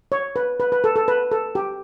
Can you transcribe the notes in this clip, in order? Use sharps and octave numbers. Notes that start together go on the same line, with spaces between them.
C#5
B4
B4
B4
A4
A4
B4
A4
G4